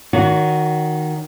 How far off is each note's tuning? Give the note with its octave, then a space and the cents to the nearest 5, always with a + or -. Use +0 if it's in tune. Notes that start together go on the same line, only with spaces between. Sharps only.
D#3 +0 F#4 +0 C#5 +40